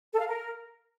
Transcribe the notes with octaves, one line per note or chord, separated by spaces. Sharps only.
A4
F5
A#4